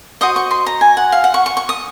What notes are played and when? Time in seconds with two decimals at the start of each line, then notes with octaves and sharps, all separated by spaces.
0.21 F#4 C5 D#5 D#6
0.36 C#6
0.51 C6
0.66 A#5
0.81 G#5
0.97 F#5
1.12 F5
1.24 F#5
1.34 C#6
1.46 C#6
1.57 C#6
1.69 D#6